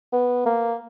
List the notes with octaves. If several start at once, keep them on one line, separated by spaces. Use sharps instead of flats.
B3
A#3